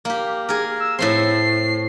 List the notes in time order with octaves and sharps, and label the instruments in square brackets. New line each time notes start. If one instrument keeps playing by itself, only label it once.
[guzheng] A#3 G4
G#4 A#4
[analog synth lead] E6
[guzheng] A2 A3 C4 [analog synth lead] C7